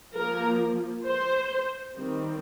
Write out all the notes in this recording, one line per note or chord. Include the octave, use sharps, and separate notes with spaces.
F3 A#3 A#4
C5
D#3 G3 C4